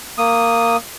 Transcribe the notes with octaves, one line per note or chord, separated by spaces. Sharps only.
A#3 D#6